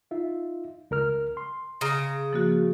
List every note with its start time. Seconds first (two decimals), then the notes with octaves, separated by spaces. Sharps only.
0.11 D#4 F4 E5
0.91 C#2 A#4 F6
1.37 C6
1.81 C#3 A#5
2.33 F3 A#3 F#4